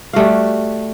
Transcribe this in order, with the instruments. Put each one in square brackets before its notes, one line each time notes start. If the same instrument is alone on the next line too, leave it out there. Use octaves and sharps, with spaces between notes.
[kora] G3 A3 F#4 F5